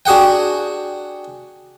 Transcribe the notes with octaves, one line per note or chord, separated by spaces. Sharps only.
D4 F#4 G#4 F#5 G5